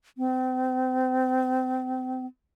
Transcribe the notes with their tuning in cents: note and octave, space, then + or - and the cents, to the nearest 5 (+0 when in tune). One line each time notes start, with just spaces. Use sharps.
C4 -30